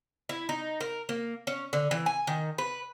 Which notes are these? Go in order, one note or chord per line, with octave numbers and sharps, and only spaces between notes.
E4
D#4
A#4
A#3
C#4
D3
E3
G#5
D#3
B4